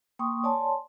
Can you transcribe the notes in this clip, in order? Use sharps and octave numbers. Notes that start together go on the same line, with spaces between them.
A#3 G5 C6 C#6 D#6
C#5 D5 G#5 A5 C6